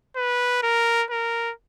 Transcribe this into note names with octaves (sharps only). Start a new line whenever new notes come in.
B4
A#4
A#4